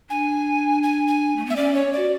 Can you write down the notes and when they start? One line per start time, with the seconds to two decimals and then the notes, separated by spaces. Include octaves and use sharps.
0.10 D4 G#5
0.83 G#5
1.08 G#5
1.36 A3
1.46 B3 E5
1.56 C#4 D5
1.74 C#5
1.93 F#4 D5